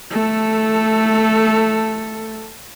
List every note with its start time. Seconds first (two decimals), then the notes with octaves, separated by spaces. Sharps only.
0.11 A3 A4